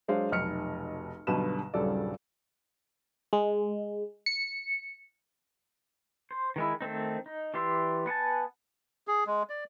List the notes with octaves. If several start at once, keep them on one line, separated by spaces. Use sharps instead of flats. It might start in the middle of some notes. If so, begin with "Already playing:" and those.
F#3 G#3 D4 C5 F5
F1 B1 F6 C#7
B1 G2 B2 D3 B4 E7
D#1 G2 C#3 F#3 A4 D5
G#3
C#7
C5
D#3 G#3 E4
D#3 A3 C4 D#4
D#4
E3 G4 D5 E5 C6
B3 F#5 G#5 A5
G#4
G#3
D5